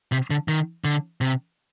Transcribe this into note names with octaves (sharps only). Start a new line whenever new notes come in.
C3
D3
D#3
D3
C3